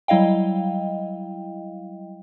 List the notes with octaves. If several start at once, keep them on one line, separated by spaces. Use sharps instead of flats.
F#3 G3 E4 D#5 F5 G5